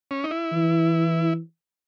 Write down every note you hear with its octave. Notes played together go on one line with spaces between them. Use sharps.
C#4
D#4
E4
E3